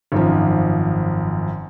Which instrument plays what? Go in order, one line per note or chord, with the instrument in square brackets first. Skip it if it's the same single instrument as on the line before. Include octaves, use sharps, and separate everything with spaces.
[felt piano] G#1 F#2 F3